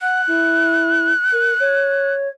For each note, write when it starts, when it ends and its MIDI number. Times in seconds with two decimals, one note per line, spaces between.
0.01 0.21 78
0.01 2.14 90
0.27 1.12 64
1.32 1.53 70
1.60 2.29 73